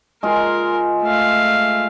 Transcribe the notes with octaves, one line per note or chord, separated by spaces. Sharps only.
G#3 F4 A#4
A3 F5